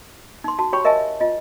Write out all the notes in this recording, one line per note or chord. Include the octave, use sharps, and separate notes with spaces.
D#4 C6
F#4 A5
F#4 G4 C#5 G5 B5 C#6
A#4 D#5 E5 G#5 A5
F4 D#5